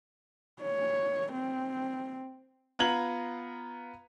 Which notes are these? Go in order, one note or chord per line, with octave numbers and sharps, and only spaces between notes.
C#5
C4
B3 F4 A#5 G#6 F#7